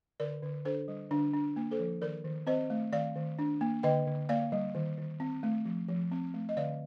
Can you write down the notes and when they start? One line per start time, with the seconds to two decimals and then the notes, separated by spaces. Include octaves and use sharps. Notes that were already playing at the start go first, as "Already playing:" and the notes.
0.20 D3 A#4 D5
0.42 D3
0.65 D4 A4 C5
0.88 G3
1.11 D3 D4
1.34 D4
1.56 A#3
1.71 A4 C5
1.79 F3
2.02 D#3 A#4 D5
2.25 D#3
2.47 C4 C5 D#5
2.70 A3
2.93 D#3 D5 F5
3.16 D#3
3.39 D4
3.61 A#3
3.83 D3 D#5 G5
4.07 D3
4.29 A#3 D5 F5
4.52 G3
4.75 D#3
4.98 D#3
5.20 C4
5.43 A3
5.66 F3
5.88 F3
6.12 C4
6.34 A3
6.49 D#5
6.57 D3 D5 F5